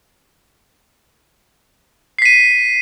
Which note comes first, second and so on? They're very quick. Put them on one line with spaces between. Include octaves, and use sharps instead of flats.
C7 B6 D#7